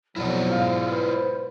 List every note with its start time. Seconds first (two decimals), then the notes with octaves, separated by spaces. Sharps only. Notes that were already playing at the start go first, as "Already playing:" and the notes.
0.16 B1 F2 F#3 E4 F4 C5 D5
0.51 G#2 F5
0.90 B4 C5